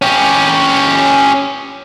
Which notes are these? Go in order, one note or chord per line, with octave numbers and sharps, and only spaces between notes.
C#4 G4